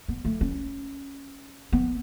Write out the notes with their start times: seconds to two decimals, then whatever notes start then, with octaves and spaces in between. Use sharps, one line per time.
0.08 B3
0.25 A3
0.41 C#4
1.72 B3